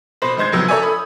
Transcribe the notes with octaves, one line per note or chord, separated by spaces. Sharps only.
B2 C5 B5
G#1 G#3 C5 G6 G#6
F#1 F2 F#3 B3 E6 G6
A4 A#4 C#5 D5 E5 G#5
B5 D#6